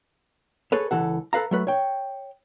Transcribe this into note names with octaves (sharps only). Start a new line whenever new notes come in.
G#4 A4 B4 C#5
C#2 E3 A4 F#5
A4 B4 F5 A#5
F#3 A3 B4
C#5 G5